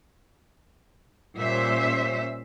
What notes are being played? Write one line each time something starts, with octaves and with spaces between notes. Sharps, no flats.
A#2 G3 C#4 C5 E5